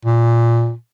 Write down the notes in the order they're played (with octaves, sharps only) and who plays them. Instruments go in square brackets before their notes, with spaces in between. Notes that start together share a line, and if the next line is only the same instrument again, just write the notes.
[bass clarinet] A#2